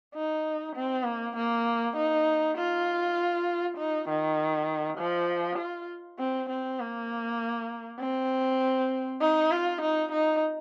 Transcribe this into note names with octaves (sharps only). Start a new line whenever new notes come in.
D#4
C4
A#3
A#3
D#4
F4
D#4
D#3
F3
F4
C4
C4
A#3
C4
D#4
F4
D#4
D#4